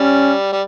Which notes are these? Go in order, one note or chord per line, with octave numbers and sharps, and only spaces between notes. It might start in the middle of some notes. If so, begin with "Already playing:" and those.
Already playing: G3 C#4
G3